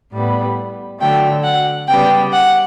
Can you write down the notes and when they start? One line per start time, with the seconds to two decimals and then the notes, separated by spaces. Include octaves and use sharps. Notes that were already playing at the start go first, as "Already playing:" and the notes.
0.12 A2 G3 B3
1.00 D3 F#3 A3 G5
1.44 F#5
1.88 C#3 G3 B3 G5
2.33 F#5